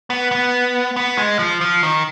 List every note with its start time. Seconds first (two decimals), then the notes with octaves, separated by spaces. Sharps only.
0.10 B3
0.31 B3
0.96 B3
1.18 G#3
1.39 F3
1.61 F3
1.83 D#3